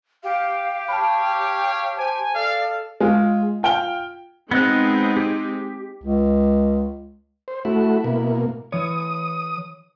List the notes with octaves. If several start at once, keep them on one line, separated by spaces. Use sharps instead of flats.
G4 F5
C#5 F5 G5 A5 B5
C5 G#5 A5
A4 D5 F5
G#3 F4
F4 G5 F6 G7
G#3 B3 C4 D#4 D#5 F#6
G4
C#2
C5
A3 E4 F#4
B2 A#3
E3 C#5 D#6